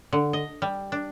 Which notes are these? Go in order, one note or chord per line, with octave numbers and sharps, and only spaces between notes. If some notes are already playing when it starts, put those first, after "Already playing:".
D3
D#5
G3
D4